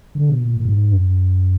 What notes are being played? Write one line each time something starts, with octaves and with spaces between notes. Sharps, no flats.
D3
B2
A#2
A#2
G#2
F#2